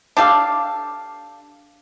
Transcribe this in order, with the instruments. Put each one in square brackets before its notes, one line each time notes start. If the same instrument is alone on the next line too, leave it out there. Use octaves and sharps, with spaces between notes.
[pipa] D4 G4 A4 F5